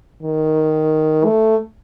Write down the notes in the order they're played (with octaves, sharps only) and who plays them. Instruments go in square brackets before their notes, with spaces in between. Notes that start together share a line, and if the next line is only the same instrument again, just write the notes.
[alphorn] D#3
A3